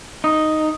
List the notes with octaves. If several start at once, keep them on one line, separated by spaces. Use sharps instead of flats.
D#4 D#6